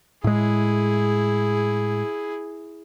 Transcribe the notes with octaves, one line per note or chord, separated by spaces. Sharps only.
A2 G#3 E4 G#4